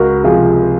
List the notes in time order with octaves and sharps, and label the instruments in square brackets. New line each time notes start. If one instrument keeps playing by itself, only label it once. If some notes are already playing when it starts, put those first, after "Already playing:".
Already playing: [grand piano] C#2 [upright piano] F#4 A#4
[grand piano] C3 F3 [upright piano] F4 G#4